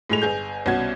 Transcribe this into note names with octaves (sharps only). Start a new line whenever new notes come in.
A2 G#3 F7
G1 G#4 G6
C2 B2 C#4 F#4 G#6